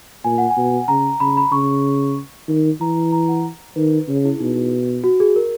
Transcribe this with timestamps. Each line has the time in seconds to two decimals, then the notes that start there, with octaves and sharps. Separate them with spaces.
0.24 A#2 G#5
0.38 F#5
0.50 G#5
0.57 B2
0.88 C#3 A#5
1.20 C#3 B5
1.37 B5
1.52 C#3 C#6
2.48 D#3
2.81 E3 A#5
3.12 A#5
3.28 F#5
3.76 D#3 B4
4.08 C#3 G#4
4.25 E4
4.40 B2 D#4
5.04 F#4
5.20 G#4
5.36 A#4